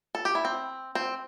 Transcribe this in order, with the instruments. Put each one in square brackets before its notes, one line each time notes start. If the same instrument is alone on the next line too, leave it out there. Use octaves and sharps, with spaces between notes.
[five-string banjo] A4
G4
E4
C4
C4